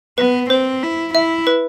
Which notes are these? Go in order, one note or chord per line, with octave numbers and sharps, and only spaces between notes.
B3 B4
C4 C5
E4
E4 E5
B4